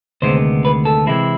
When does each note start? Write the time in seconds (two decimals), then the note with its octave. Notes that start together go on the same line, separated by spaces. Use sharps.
0.22 D2 C3 D#3 G#3 B3 C5
0.65 B4
0.85 A4
1.07 C3 E3 G#3 C4 E4